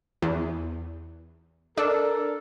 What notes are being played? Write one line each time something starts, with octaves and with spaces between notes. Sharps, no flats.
E2
D4 A4 A#4